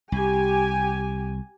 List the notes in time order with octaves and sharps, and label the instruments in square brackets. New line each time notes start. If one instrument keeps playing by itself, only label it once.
[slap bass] C2 [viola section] G4 G#5